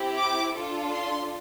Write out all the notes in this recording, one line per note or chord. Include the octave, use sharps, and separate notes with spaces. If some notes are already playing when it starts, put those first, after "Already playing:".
Already playing: C4 E4 G4
D6
D4 F4 A4
C6